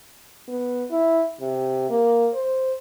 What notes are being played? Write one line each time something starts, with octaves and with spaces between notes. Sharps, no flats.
B3
E4
C3
A#3
C5